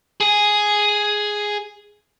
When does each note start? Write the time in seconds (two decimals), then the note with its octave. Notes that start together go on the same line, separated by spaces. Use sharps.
0.21 G#4 G#5